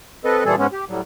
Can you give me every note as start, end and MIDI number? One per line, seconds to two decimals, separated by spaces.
0.24 0.44 60
0.24 0.44 69
0.24 0.44 71
0.24 0.44 75
0.45 0.55 46
0.45 0.55 52
0.45 0.55 55
0.45 0.55 68
0.45 0.55 69
0.58 0.67 44
0.58 0.67 56
0.58 0.67 59
0.58 0.67 61
0.72 0.85 67
0.89 1.01 45
0.89 1.01 54
0.89 1.01 55